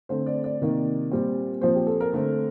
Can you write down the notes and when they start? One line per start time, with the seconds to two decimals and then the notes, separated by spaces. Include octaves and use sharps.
0.09 D3 A3 C4 C5
0.26 D5
0.44 D5
0.61 C3 D#3 A#3
1.12 A#2 G3 C4
1.61 A#2 F3 C4 C5
1.75 G4
1.87 A4
2.01 A#4
2.13 D3 A3 C4